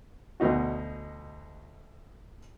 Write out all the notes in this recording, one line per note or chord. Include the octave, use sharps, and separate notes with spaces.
D2 B2 D#4 F#4